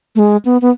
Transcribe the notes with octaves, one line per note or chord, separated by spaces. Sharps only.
A3
G#3
B3
B3